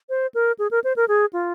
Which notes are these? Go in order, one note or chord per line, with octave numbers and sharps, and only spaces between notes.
C5
A#4
G#4
A#4
C5
A#4
G#4
F4